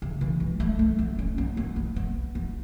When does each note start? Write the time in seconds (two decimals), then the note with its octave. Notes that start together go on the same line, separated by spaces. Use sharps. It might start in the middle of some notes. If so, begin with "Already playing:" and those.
0.02 C#3
0.21 E3
0.40 G#3
0.60 A3
0.79 A3
0.99 B3
1.19 C#4
1.38 B3
1.57 B3
1.76 B3
1.96 B3
2.35 B3